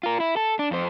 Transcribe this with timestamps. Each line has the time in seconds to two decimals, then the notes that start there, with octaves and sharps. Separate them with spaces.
0.03 F4 A#4
0.20 E4
0.36 A4
0.59 D4
0.71 F2 C5